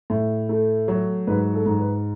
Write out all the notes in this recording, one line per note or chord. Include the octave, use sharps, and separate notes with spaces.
A2
A3
F#3
G#2 B4
A4
G#2
B4